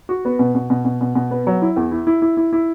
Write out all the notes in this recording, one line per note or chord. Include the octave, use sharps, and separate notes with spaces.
F#4
B3
B2
B2
B2
B2
B2
B2
B3
F#3
E4
E2
E4
E4
E4
E4
E4